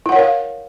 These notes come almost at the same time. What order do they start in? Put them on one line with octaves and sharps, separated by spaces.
E4 F#5 C#5 A#4 F5